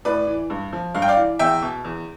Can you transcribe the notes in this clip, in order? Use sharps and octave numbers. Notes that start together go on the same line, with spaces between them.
A2 B4 D5
E3
G2
F3
G2 F5
G5
D5 F5
E3
E2 E5 G5
B2
E2